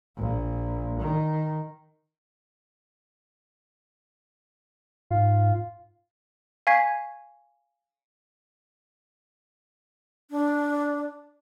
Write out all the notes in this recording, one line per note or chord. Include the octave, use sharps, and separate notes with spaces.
A#1
D#3
G#2 F4
F5 G#5 C#6 G#6 B6 C7
D4